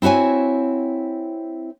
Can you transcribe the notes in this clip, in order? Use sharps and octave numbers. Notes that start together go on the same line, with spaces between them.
C4 E4 F#4 C#5 G#5